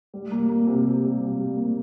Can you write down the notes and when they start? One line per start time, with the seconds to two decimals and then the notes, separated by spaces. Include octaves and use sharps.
0.14 G3
0.31 A#3
0.49 A#3
0.67 C3
0.85 C3
1.03 G3
1.21 C3
1.38 G3
1.56 A#3